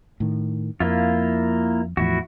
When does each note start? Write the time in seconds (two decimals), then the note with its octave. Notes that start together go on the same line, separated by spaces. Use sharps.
0.20 A2 D#3
0.80 F2 A#3 E4 F4
1.97 E2 A2 F3 E4 F#4